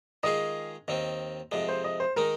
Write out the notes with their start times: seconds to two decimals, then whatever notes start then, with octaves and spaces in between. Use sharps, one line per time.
0.23 D#3 G#3 F4 G#4 D#5
0.88 D#2 D#3 C4 D#5
1.52 F2 C3 G#3 D#5
1.68 C5
1.84 D#5
2.00 C5
2.16 D#3 G#3 D#4 A#4